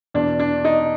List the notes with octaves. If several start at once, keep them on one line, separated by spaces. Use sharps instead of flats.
E2 B2 D4
D4
D#4